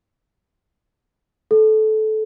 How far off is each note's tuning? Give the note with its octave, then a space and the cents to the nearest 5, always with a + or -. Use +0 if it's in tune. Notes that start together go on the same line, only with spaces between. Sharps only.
A4 -20